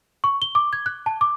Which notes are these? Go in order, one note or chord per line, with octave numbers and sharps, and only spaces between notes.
C#6
G7
D6
G#6
F#6
A5
D6